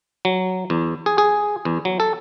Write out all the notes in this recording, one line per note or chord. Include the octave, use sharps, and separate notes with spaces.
F#3
E2
G#4
G#4
E2
F#3
A4